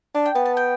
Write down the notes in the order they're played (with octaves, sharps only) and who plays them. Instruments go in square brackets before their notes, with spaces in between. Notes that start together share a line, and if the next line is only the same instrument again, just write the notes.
[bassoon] D4 [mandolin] A5
[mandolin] G5
[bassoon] B3 [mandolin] A5
[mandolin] A5
G5